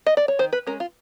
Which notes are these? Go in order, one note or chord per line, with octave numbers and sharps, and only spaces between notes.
D#5
D5
C#5
D#3 C5
B4
G#3 C#4 A#4
F4